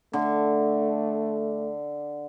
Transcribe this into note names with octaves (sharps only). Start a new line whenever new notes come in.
D3 A3